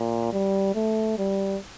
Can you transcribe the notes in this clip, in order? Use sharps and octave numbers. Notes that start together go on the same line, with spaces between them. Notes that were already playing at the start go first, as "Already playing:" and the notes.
Already playing: A#2
G3
A3
G3